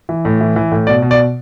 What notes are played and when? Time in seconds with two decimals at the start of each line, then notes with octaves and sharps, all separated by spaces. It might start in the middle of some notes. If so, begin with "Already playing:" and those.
0.09 E3
0.25 A2
0.41 E3
0.56 E3
0.72 A2
0.87 B2 D5
1.02 B2
1.11 D5